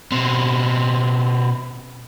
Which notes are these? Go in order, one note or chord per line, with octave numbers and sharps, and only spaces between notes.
B2 C4